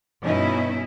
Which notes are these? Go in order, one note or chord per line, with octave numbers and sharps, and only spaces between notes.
G2 B2 C#4 D#4 E4